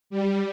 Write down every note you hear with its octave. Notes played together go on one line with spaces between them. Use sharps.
G3